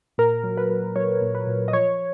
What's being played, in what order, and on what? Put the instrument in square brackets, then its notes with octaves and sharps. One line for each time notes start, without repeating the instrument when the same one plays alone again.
[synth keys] A#2 A#4
F#3
B4
F#3
F#3 C#5
A#2
B4
A#2
D#5
F3 C#5